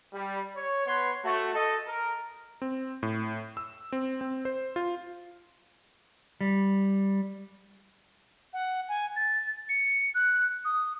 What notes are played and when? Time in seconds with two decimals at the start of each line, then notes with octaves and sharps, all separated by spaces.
0.13 G3
0.56 C#5
0.86 B3 B4 C#5 C6
1.24 A3 F#4
1.54 A4 D#5
1.87 A#4
2.62 C4
3.03 A2
3.57 E6
3.92 C4
4.21 C4
4.45 C5
4.76 F4
6.41 G3
8.53 F#5
8.88 G#5
9.16 A6
9.69 C#7
10.15 F#6
10.65 D#6